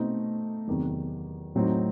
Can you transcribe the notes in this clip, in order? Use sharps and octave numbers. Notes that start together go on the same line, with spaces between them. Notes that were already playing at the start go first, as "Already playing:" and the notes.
Already playing: B2 A3 C4 D#4
E2 C3 D#3 F#3
A2 F#3 C4 D#4